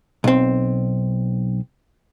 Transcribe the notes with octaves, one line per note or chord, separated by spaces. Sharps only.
B1 C4